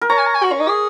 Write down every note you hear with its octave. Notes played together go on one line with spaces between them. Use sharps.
A#4
C#5 A#5
G#5
A#5
G#5
F#4
C#4
D#4
G#4